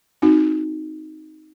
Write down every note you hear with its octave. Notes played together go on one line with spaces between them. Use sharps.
C4 D#4 F#4